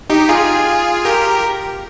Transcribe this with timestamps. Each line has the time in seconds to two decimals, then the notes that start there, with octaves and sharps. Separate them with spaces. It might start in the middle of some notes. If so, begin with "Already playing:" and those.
0.10 D#4 G4
0.29 F4 G#4
1.05 G4 A#4